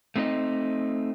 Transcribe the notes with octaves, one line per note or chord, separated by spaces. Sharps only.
A3 C4 D#4 B4 D#5